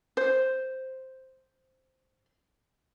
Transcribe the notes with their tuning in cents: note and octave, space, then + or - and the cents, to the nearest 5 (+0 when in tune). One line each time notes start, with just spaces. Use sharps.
C5 +0